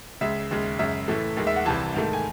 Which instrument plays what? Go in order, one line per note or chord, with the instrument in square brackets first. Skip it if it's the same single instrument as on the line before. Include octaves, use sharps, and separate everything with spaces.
[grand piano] C#2 C#3 G#3 E5
D#2 C#3 G#3
F#2 C#3 G#3 E5
A2 E3 A3
D#2 D#3 G#3
E5
F#5
C2 C3 E3 A5
G#2 D#3 A3
G#5